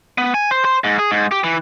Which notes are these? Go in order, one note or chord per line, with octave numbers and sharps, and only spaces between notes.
B3
G#5
C5
C5
G#2
G#4
G#2
G4
E3